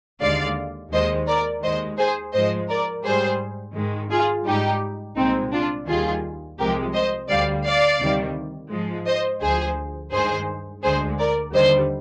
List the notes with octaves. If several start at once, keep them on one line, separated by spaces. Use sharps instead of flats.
D#2 D3 G#3 D5 F5
D#2 D#3 G#3 C5 D#5
A#4 D5
D#2 D#3 G#3 C5 D#5
G#4 C5
G#2 F3 G#3 C5 D#5
A#4 D5
G#2 G3 G#4 C5
G#2 D#3 G#3
F4 G#4
G#2 G3 D#4 G4
C2 A#2 G#3 C4 D#4
D4 F4
D#2 D#3 G3 F4 G#4
C2 C3 F3 G#3 G4 A#4
C5 D#5
D2 D3 G3 D5 F5
D5 F5
D2 C3 D#3 G3
G#2 F3 G#3
C5 D#5
D2 D3 F3 G#4 C5
G2 D#3 G#3 G#4 C5
D2 D3 G#3 G#4 C5
A#4 D5
D#2 D3 G3 C5 D#5